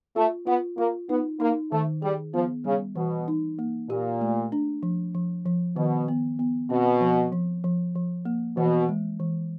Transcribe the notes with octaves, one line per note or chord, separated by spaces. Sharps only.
A3 F4
B3 F4
A#3 F4
B3 D#4
A#3 D#4
D#3 A3
G3 G#4
F3 B3
C#3 G3
B2 E3
D#4
A#3
A#2 G4
A3
D4
F3
F3
F3
B2 D#3
B3
B3
B2 C4
F3
F3
F3
F3
A#3
B2 E3
G#3
E3